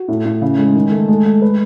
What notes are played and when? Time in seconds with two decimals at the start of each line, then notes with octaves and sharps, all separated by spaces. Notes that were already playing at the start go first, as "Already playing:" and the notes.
Already playing: F#4
0.08 A2
0.25 A2
0.42 C#3
0.59 G#3
0.75 D#3
0.92 A3
1.09 G#3 A4
1.25 G#3
1.42 G#3 B4